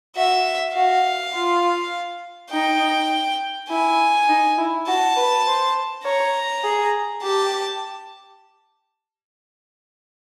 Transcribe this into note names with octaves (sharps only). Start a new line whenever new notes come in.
F#4 E5
F#4 F5
F4
D#4 G5
E4 G#5
D#4
E4
F#4 A5
B4
C5
C#5 A#5
G#4
G4 A5